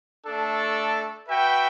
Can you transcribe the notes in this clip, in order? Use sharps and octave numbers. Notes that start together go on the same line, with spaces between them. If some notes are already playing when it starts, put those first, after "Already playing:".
A3 D4 A4
F#4 B4 E5 G5